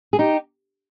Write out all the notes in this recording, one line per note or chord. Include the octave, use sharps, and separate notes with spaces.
G#4
D#4 G4